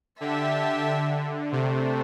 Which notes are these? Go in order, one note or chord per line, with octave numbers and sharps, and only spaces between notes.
D3 G4 E5 A5
C3 A3 D4 C5